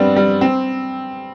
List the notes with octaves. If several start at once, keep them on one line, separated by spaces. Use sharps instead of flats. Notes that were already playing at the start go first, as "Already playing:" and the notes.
Already playing: G3 B3 C4 D4
G3
C4